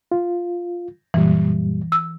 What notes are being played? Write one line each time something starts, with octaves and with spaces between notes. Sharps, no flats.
F4
F#2 A#2 E3 G3
E6